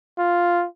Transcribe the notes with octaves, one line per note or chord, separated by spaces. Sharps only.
F4